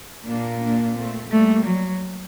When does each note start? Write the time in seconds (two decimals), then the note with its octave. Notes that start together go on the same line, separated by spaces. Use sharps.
0.27 A#2 A#3 D4
0.62 A#3 D4
0.97 A3 C4
1.31 G3 A3 A#3
1.66 F#3